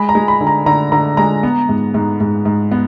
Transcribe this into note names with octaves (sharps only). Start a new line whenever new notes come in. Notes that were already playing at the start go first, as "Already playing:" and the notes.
Already playing: G#3 B5
A#5
G#3
B5
D3
A#5
D3 A#5
D3 A#5
G#3 A#5
B3
G#2
G#2
G#2
G#2
B3